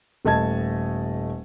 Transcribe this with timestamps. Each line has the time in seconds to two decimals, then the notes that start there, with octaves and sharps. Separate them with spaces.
0.25 D#1 A3 D#5 A5 G#6